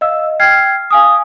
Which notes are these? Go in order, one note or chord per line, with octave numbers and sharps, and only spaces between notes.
D#5 F5 E6
G5 F6 G#6 C7
F5 G#5 D#6